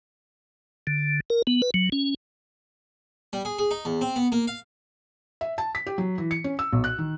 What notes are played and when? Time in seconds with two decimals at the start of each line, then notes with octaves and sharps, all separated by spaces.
0.87 D3
1.30 A#4
1.47 B3
1.62 B4
1.74 F#3
1.92 C#4
3.33 G3
3.45 G#4
3.59 G#4
3.71 D#4
3.85 E2
4.01 C4
4.16 B3
4.32 A#3
4.47 F5
5.41 E5
5.58 A5
5.75 B6
5.86 G4
5.98 F#3
6.18 E3
6.31 C#7
6.44 C#4
6.59 E6
6.73 B1
6.84 F#6
6.98 D#3